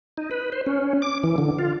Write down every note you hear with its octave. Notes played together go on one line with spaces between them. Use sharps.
D#4
B4
C5
C#4
D6
E3
D3
F4